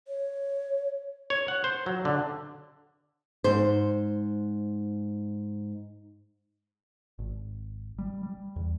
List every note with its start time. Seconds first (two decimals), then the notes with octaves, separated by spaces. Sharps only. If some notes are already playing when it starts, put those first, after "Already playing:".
0.08 C#5
1.30 C#5
1.48 F#5
1.64 C5
1.86 F#3
2.05 D3
3.44 G#2 C5
7.19 G#1
7.99 G3
8.23 G3
8.56 E2